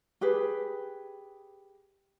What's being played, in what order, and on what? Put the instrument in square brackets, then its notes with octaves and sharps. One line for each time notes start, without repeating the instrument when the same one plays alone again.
[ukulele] G4 G#4 B4